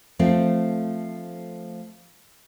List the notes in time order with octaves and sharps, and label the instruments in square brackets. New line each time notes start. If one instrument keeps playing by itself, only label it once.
[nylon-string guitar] F3 A3 C4